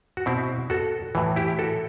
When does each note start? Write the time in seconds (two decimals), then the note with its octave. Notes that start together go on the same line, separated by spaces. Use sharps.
0.17 F#4
0.26 B2 C4 E4
0.70 F#4 A4
1.15 A2 E3
1.36 E4 G4
1.59 F#4 A4